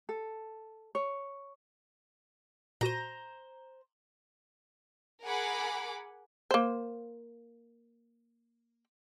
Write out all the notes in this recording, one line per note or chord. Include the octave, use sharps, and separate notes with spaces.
A4
C#5
A#2 F#4 C5 A#5 D#7
G#4 A#4 F#5 G#5 B5 D6
A#3 C5